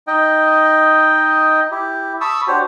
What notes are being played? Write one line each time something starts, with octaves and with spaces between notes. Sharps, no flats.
D#4 D#5 G5
E4 G4
A5 B5 C#6 D#6 E6
D4 F#4 G4 C5 C#5